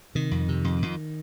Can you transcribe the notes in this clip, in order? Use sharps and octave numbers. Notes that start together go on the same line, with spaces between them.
C3 D#3
F2
C3
F2
F2